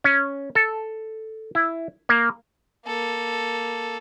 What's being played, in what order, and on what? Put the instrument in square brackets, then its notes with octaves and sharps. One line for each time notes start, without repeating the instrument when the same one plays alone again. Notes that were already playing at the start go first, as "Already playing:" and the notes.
[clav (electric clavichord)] C#4
A4
E4
A#3
[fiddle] A#3 A4